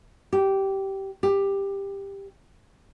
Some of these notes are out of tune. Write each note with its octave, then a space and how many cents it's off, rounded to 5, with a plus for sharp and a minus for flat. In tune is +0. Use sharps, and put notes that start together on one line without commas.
G4 -15
G4 +10